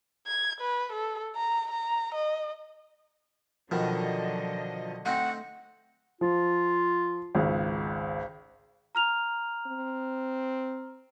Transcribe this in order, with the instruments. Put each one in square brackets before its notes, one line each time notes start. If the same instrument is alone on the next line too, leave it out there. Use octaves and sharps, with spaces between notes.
[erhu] G#6
B4
A4
A#5
A#5
D#5
[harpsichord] B2 D#3 [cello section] D3 F#3 D#5 [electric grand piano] F3
[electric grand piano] A3 [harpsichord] C4 D#4 [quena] F#5
[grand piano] F3 [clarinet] F4
[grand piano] G#1 C#2
[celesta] A#5 F6 F7
[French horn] C4